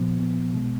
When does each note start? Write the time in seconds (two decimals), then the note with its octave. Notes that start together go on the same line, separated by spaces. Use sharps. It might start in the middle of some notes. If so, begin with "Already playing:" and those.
Already playing: A#2 F3 B3
0.17 A#2 F3 B3
0.54 B2 G#3 B3